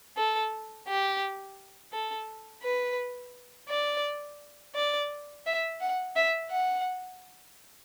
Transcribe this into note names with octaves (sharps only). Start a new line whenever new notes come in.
A4
G4
A4
B4
D5
D5
E5
F#5
E5
F#5